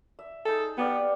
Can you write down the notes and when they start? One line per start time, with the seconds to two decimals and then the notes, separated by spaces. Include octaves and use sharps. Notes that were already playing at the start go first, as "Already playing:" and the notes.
0.19 E5
0.45 D#4 G#4 A4
0.78 G3 B3 D5 F5